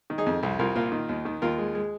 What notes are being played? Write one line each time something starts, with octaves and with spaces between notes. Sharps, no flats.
D#3
D#4 G#4
F2
C2
C2 F4 A#4
A#2 F4 A#4
D#3
D#2
D#3
D#2 F4 A#4
G#3
G#3